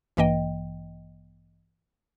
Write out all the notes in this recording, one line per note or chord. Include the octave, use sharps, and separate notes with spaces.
A1 G2 E3 A#3 D#5 G5